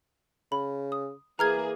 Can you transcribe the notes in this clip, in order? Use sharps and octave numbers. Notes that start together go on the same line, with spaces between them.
C#3 B5
D#6
E3 A#3 G#4 A#5 F6 G#6